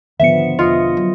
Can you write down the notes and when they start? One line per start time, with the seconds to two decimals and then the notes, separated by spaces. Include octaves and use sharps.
0.20 G#2 D3 D#3 F3 B3 E5 C#7
0.59 E1 D#4 F4 D#5
0.97 F#3